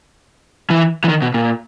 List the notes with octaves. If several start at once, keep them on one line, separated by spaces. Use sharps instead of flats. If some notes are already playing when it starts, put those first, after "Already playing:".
E3
E3
D#3
B2
A#2